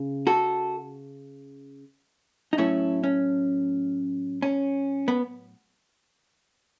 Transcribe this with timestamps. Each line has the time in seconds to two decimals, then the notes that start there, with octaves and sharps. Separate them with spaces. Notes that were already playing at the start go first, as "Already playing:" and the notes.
Already playing: C#3
0.27 F#4 A4
2.53 D#4
2.58 A2 F#3 A3 C#4 E4
3.03 C#4
4.42 C#4
5.08 B3